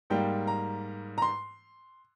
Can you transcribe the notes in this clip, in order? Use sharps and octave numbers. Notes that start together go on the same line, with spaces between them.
G#2 G3 A#3 G5
A#5
A#5
C6